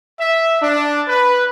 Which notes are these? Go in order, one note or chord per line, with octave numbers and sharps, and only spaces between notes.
E5
D4
B4